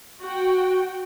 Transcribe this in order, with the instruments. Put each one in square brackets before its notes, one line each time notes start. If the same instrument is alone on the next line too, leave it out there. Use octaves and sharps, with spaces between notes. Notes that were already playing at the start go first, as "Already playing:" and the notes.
[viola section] F#4 G5